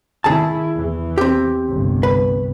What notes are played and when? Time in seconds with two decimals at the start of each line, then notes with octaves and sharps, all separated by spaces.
0.24 D#3 E4 G#4 A5
0.75 E2 E3
1.18 C4 G4
1.68 G1 C2
2.03 B4